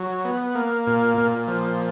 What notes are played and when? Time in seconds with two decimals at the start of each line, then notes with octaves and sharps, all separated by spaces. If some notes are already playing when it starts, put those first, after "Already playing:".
Already playing: F#3
0.25 B3
0.55 A#3
0.87 A#2
1.18 A#2
1.48 F3